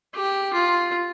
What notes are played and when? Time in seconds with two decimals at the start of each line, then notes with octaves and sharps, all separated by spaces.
0.14 G4
0.53 F4